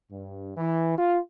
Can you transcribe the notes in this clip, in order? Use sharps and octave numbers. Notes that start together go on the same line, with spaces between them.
G2
E3
F4